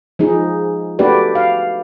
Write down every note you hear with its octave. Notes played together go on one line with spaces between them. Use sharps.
F3 G#3 D#4 G#4
A3 D4 F#4 G4 B4 D5
F5